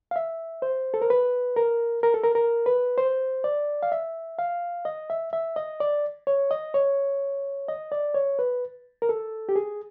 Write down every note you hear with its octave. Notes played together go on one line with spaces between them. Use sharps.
F5
E5
C5
A4
A#4
B4
A#4
A#4
A4
A#4
A#4
B4
C5
D5
F5
E5
F5
D#5
E5
E5
D#5
D5
C#5
D#5
C#5
D#5
D5
C#5
B4
A#4
A4
G4
G#4